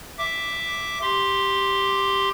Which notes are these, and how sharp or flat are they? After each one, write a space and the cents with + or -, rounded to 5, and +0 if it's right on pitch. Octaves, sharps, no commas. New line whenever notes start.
E5 +0 D6 +0
G4 +0 C6 +0